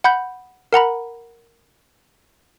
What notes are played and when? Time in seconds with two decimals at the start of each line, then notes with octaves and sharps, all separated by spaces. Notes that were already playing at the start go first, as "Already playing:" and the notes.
0.04 F#5 B5 G6
0.73 A#4 F#5 A#5 B5